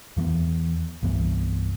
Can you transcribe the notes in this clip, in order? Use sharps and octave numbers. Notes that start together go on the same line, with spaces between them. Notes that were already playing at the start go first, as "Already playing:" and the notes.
E2 E3 F#3 B3
C2 G2 E3 B3